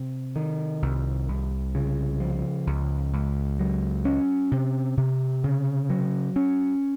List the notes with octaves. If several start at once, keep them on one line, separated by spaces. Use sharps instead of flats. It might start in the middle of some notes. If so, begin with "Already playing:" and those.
Already playing: C3
D#3
C2
C2
C#3
F3
C#2
C#2
F#3
C#4
C3
C3
C#3
F#3
C#4